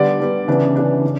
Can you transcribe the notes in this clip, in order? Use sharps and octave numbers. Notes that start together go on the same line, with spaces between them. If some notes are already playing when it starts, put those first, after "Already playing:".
Already playing: D3 G3 B3 D5
D3 G3 B3
C#3 E3 B3 D4
C#3 E3 B3 D4
C#3